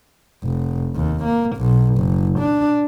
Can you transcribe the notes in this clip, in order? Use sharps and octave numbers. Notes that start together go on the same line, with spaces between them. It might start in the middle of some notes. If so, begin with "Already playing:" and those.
F1
D#2
A#3
B1
F#1
D4